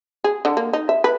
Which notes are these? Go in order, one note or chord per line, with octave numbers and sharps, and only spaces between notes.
G#4
D3
A#3
D#4
E5
B4